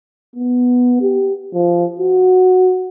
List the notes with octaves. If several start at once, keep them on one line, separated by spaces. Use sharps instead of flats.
B3
G4
F3
F#4